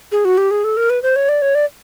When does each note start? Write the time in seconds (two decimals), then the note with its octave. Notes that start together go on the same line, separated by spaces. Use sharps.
0.12 G#4
0.25 F#4
0.38 G4
0.51 G#4
0.64 A4
0.77 A#4
0.90 B4
1.03 C5
1.16 C#5
1.29 D5
1.42 C#5
1.55 D5